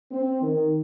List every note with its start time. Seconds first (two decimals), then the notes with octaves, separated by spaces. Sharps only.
0.11 C4
0.42 D#3